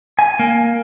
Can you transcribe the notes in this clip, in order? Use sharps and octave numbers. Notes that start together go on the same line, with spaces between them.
G#5
A#3